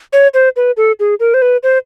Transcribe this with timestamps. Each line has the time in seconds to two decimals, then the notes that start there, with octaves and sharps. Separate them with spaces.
0.13 C#5
0.34 C5
0.56 B4
0.77 A4
1.00 G#4
1.20 A#4
1.34 C5
1.42 B4
1.63 C5